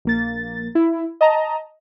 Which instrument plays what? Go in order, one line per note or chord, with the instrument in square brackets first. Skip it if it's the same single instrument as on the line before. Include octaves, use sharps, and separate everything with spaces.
[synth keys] A#1 A#3 A6
E4
D#5 A5 A#5